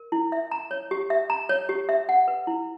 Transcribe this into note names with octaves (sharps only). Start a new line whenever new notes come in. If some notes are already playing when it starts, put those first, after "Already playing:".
Already playing: A#4
E4
E5
A#5
C#5
G4
E5
A#5
C#5
G4
E5
F#5
B4
E4